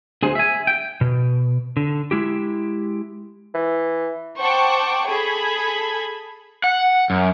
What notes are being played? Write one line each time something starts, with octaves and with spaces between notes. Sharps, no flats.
D2 G#4 C5
E5 G#5
G5
B2
D3
G#3 E4 G4
E3
C5 F#5 G5 A5 C#6 D6
G#4 A4 B5 G#6
F#5
F#2